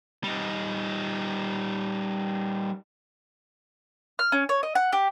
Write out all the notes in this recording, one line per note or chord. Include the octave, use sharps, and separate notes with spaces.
G3 D#4
F6
C#4
C#5
D#5
F#5
G4